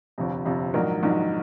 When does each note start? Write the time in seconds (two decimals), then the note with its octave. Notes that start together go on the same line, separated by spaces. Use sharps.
0.18 G1 F2 C3
0.45 G1 F2 C3
0.74 A#1 G#2 D#3 F#3 A#4
1.03 A#1 G#2 D#3 F#3